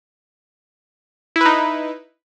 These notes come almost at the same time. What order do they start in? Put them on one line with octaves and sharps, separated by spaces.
E4 B4 D#4